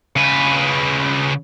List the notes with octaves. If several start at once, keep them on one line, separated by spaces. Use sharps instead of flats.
C#3 B4